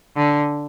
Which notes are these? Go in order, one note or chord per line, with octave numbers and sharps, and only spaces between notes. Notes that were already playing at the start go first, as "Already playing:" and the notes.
D3